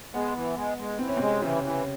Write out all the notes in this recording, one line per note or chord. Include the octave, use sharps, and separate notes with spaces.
G#3 B3
E3
G#3
G#3
E3 C4
C#4
C3 G#3 C4
C#3 E3 C#4
E3